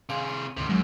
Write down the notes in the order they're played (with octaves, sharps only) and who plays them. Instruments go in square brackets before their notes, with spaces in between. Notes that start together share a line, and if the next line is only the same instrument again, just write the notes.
[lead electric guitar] C3 G#4 [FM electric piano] F5
[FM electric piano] G#5
[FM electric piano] D2 G#2 [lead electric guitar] C3 D#3
[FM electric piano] C#2 F#3 G#3 [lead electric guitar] F#2